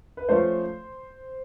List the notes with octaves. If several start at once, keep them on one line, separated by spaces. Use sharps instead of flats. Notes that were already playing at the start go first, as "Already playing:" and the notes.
B4
F3 A3 C#4 C5